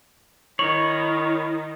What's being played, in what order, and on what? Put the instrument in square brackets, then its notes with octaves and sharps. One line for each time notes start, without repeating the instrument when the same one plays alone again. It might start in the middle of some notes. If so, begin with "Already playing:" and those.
[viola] D#3 [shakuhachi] E4 [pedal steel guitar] C#5 [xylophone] C#6